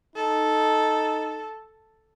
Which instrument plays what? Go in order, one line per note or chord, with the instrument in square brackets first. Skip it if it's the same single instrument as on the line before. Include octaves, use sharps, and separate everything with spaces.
[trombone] D#4 [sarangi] A4